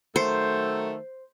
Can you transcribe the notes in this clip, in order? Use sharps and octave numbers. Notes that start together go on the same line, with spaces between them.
D#3 F#3 A3 C5